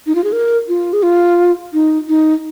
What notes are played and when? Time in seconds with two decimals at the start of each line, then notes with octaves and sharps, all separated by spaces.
0.07 D#4
0.15 F4
0.24 G#4
0.32 A#4
0.69 F4
0.93 G#4
1.03 F4
1.73 D#4
2.09 D#4